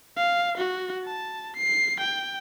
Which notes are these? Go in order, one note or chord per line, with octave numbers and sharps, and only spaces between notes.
F5
F#4
A5
C7
G5